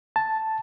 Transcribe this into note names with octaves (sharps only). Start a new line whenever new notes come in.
A5